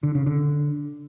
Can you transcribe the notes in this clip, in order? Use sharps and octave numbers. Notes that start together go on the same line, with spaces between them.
D3
C#3
D3